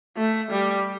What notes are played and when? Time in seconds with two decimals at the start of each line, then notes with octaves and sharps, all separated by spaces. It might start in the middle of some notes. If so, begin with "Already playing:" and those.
0.17 A3
0.50 G3